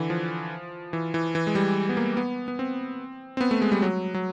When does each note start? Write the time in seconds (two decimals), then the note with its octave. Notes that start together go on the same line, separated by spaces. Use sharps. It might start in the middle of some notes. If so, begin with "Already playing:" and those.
Already playing: D3 E3
0.10 F3
0.93 E3
1.14 E3
1.35 E3
1.47 G#3
1.55 G3
1.89 B3
1.97 A#3
2.17 B3
2.48 B3
2.59 C4
3.37 C4
3.41 B3
3.51 A3
3.62 G#3
3.72 G3
3.82 F#3
4.14 F#3